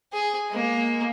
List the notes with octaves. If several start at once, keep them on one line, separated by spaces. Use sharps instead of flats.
G#4
G#3 A#3